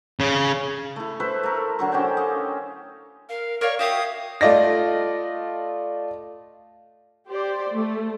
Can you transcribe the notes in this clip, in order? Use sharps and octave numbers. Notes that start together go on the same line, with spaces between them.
C#3
A3 E4
B4 C5 E5 C#6
A3 A#4
D3 F#3 C#6
C#4 G4 C5 G5
D#5 F5
A#4 F5
A#4 C#5 D5 F5 C#6
F#4 G4 E5 F5 D#6
A3 F4 D5 D#5 A#6
G4 C5 D5
A3